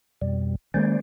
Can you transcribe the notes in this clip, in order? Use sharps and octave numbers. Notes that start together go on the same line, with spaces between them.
F2 B2 G3
D#3 G#3 A#3 C#4 C5 D5